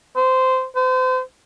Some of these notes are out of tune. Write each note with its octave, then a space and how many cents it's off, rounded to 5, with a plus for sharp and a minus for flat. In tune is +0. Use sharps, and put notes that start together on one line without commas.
C5 -15
C5 -35